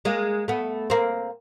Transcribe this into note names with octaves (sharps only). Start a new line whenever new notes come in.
G#3 A#3
A3 B3
A#3 C4